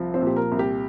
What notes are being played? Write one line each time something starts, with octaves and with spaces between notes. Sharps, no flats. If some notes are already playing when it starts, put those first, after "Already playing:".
Already playing: C2 F3
C4 C5
A#2 G4
A#4
C2
G4